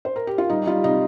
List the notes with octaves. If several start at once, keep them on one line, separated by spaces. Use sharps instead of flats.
C5
A#4
G4
F4
G3 D#4
G3 F4
C3 D#4